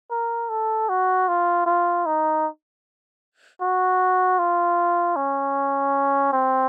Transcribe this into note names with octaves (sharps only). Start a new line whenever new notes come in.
A#4
A4
F#4
F4
F4
D#4
F#4
F4
C#4
C4